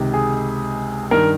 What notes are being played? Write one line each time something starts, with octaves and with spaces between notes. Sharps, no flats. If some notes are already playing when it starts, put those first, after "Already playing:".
Already playing: C#2 C3 D#3
G#4
G2 D#3 A#4